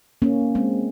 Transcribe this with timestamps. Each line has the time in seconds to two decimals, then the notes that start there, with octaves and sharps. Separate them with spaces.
0.22 A#3 C#4
0.55 G#3 C4